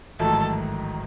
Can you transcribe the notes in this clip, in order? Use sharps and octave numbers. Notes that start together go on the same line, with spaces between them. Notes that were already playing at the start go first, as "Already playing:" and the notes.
A1 G#2 D#3 F#3 A3 A4